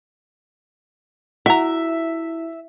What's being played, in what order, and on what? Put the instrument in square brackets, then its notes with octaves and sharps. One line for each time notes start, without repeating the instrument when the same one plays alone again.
[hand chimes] E4 [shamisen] F#4 A#5 [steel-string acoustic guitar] E5